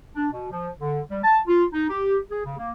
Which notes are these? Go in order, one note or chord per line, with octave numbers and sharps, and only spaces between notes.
D4
B2
F3
D3
G3
A5
F4
D#4
G4
G#4
C#3
A#3